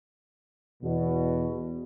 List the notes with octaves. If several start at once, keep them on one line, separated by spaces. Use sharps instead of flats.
E2 B2